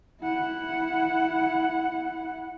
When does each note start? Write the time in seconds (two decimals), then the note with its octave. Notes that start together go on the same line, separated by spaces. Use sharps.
0.22 E4 F#5